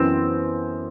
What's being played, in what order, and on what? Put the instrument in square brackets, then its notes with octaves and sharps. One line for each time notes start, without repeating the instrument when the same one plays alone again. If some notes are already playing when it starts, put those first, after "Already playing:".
Already playing: [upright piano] F#2 E3 B3 [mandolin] C4